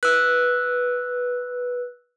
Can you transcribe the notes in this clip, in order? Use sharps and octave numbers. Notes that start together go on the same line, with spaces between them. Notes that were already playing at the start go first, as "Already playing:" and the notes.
B4 E6 F#6